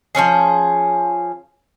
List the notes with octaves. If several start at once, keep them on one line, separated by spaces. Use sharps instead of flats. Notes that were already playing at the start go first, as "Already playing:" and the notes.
F3 B3 C#4 G#4